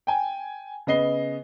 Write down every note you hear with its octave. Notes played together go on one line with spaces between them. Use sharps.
G5 G#5
C#3 B3 D#5 C7 G7